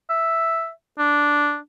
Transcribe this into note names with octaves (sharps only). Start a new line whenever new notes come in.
E5
D4